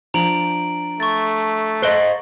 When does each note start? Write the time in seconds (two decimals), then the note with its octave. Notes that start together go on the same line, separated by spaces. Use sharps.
0.14 F3 D4 A#5 D7 F#7
1.00 A3 C#6 A6
1.82 C5 D#5 F#6 D7 G7